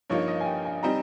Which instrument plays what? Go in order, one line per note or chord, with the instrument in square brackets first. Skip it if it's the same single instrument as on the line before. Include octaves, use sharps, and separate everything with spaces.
[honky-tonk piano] G2 F3 A#3 D#4 [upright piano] C#5
[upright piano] D#5
G#5
G5
G#5
[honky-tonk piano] G3 C4 D#4 [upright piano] A#5